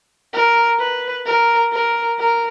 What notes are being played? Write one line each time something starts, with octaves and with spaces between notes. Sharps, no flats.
A#4
B4
A#4
A#4
A#4